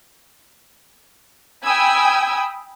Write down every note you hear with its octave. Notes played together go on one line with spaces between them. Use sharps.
G5 G#5 B5 D#6 E6 G#6